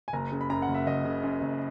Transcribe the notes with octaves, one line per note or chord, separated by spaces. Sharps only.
G#5
F#1 A#5
C#3
B5
F#2 A#5
F#5
F#1
E5
F#1 D#5
C#3
F#2
F#1